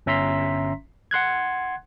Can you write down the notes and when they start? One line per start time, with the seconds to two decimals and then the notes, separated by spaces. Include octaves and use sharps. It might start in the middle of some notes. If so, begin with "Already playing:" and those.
0.06 G1 C#4 E5 A#5 C6 B6
1.11 F#5 C6 F#6 G#6